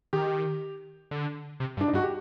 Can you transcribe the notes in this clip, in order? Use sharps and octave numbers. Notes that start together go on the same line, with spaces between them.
D#3 G4
D3
C3
G2
D4
D#4
G2 F#4
G4